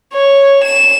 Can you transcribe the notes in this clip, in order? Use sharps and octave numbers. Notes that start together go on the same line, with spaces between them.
C#5
E7